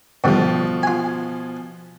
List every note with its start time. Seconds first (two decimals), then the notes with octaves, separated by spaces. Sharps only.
0.24 G#2 B2 D3 F3 G3
0.83 F4 G#5